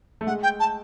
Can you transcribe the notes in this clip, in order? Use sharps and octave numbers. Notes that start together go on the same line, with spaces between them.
A3
G#3 F#5
G5
A5